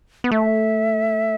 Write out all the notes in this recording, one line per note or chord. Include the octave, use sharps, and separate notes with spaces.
B3
A3 E5